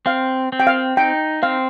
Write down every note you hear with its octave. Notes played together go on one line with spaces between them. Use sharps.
C4 F5
C4
G5
F5
D#4 G5
C4 F5